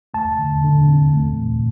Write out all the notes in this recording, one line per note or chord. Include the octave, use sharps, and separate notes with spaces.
A3 A5
D3
D3
C4
A3
A#2